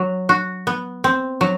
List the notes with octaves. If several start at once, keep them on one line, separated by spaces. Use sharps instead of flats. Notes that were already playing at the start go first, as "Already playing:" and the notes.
Already playing: F#3
F#4
B3
C4
F#3